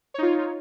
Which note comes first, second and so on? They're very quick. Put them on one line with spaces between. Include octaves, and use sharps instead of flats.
C#5 D#4 F4